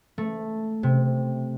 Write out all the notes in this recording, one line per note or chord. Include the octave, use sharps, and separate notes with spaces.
A3
C3